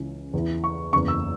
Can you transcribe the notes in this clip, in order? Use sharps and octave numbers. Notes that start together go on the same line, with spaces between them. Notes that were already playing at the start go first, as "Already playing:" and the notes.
Already playing: C#2 C#3 E3
E2 E3
C#6
F#1 E2 C#3 C#6
E6